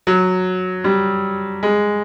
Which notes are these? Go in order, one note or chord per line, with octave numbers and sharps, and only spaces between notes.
F#3
G3
G#3